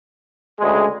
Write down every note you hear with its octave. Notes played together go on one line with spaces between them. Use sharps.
D2 C#3 G#3